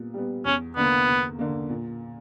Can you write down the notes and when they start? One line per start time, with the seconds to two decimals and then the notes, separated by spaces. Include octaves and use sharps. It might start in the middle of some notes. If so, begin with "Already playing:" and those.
Already playing: A#2 G3 B3
0.14 G3 B3
0.45 E2 C#4
0.77 D3 A#3 B3
1.07 E2
1.39 D3 A#3
1.69 A#2